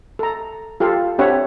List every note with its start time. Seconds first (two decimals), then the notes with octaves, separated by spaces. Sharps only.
0.19 A4 A#5
0.80 F4 G4 A4 F5
1.18 C4 D4 G4 C#5 E5 F#5